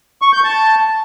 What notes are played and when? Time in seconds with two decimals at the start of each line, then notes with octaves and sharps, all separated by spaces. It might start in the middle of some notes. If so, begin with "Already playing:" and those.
0.22 C#6
0.33 G6
0.44 A5